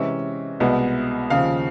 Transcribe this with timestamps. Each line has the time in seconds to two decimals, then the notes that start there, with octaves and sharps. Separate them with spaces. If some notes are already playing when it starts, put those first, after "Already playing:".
Already playing: C3 E3 G#3 C#4 E5
0.60 C2 B2 G#3 B3
1.30 D#2 C#3 F3 F5